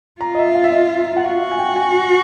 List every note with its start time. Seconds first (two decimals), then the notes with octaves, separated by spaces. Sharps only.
0.21 F4 A#5
0.35 D#5
0.39 E5
0.55 F5
0.64 E5
0.72 D#5
0.99 E5
1.16 F#5
1.24 F#4 F5
1.41 F5
1.51 G#5
1.59 G5
1.76 G#5